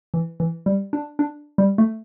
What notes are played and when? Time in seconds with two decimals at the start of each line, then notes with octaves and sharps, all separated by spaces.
0.14 E3
0.40 E3
0.66 G3
0.93 D4
1.19 D4
1.58 G3
1.78 A3